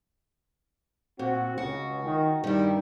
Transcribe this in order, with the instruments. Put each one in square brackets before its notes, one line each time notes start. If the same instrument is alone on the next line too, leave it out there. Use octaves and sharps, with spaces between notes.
[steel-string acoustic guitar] A#2 [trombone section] C4 F#4
[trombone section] C#2 C#3 [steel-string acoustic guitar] F#4
[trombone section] D#3
[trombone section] G2 G3 [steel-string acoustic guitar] D#3 E4